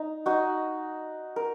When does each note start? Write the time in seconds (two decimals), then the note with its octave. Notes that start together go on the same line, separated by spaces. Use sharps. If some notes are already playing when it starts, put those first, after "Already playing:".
Already playing: D#4
0.26 D#4 F#4
1.36 A#4